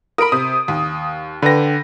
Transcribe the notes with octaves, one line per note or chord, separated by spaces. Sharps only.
A#4 B5 D#6 D7
C3 D#6
D#2
D3 B4 G5 A#6